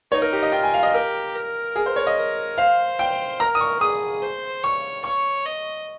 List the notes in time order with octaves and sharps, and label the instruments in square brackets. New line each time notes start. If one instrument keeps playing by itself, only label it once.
[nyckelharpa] D#4 [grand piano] C#5
[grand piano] A#4
G4
D#5
[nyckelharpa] F4 [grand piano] G5
[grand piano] G#5
F5
D#5
[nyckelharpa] G4 [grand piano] A#4
[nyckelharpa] A#4
[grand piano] G#4
C5
C#5
D#5
[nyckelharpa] A#4
[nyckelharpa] C5 [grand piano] F5
[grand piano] G5
[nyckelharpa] A#4 [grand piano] A#5
[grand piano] D#6
C#6
[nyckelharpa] G#4 [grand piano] D#6
[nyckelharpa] C5
[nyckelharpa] C#5 [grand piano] C#6
[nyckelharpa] C#5 [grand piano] C#6
[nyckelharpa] D#5